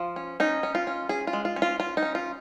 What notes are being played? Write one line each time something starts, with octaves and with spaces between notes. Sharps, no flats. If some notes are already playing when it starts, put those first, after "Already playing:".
Already playing: F3 F4
C#4
C#4 D#4
C#4
F4
C#4
C#4 G#4
F4
G#3
F4
C#4
F4
C#4 F4
D#4
C#4
F4